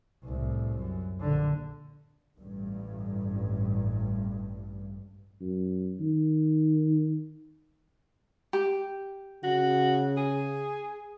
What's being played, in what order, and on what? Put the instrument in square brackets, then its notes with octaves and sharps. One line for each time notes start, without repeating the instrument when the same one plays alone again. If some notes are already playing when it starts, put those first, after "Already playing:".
[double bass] C2 A2
F#2
A#1 D3
[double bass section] A1 G2
[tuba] F#2
D#3
[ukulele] G4
[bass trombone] C#3 [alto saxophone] F#4
[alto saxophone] G#4